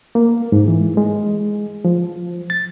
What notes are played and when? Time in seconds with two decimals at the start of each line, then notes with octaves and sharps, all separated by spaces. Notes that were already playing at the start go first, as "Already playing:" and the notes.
0.15 A#3
0.52 G#2
0.68 E3
0.97 G#3
1.85 F3
2.50 A6